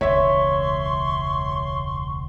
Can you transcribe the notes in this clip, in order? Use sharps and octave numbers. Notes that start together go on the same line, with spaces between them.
E1 C#2 C#5 E5 C6 C#6